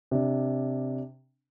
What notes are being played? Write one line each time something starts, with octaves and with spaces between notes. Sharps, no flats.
C3 D4